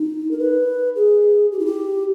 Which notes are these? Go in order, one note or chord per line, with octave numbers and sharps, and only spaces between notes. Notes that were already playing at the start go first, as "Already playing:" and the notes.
Already playing: D#4
A#4
B4
G#4
G4
E4
G4